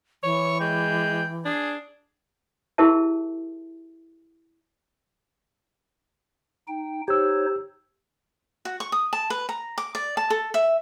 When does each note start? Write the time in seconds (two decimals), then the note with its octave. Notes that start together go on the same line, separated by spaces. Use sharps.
0.23 E3 C#5 C#6
0.60 G#3 G5
1.45 D4 G#4
2.78 E4 G4 G#4 A#4 E5 A5
6.67 D#4 G5
7.08 D#4 G4 C5 C#5 E6
8.65 F#4
8.80 C#6
8.92 D#6
9.13 A5
9.30 B4
9.49 A#5
9.78 D6
9.95 D5
10.17 A5
10.30 A4
10.54 E5